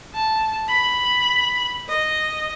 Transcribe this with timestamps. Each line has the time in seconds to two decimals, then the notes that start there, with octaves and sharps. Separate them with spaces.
0.14 A5
0.68 B5
1.88 D#5